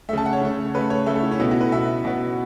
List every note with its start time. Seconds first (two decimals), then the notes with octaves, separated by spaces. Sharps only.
0.09 A3 E5
0.13 C#3 A5
0.26 F#5
0.33 C#5
0.41 C#3 A3
0.75 C#3 A3 B4
0.90 C#5
1.06 C#3 A3 E5
1.15 A4
1.23 E4
1.32 C#4
1.39 B2 B3 E4
1.51 F#4
1.61 B4
1.72 B2 B3 E5
2.05 B2 B3